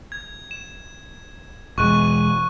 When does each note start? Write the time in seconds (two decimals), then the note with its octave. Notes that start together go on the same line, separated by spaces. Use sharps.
0.12 G#6
0.51 E7
1.78 E1 G#3 C#6 F#6 D#7